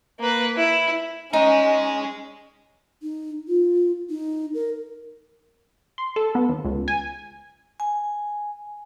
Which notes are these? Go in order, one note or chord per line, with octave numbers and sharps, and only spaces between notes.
A#3 B4
E4
C#4 D#4 D#5 G#5
D#4
F4
D#4
A#4
C6
A4
B3
D#2
C#2
G#5
G#5